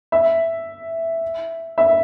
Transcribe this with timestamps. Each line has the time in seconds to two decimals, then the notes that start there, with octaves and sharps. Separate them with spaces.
0.12 E5
1.78 E5